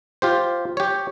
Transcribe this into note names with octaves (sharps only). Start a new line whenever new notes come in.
F4 G4 C5
G4 C#5